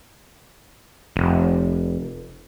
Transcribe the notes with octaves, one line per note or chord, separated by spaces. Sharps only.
F1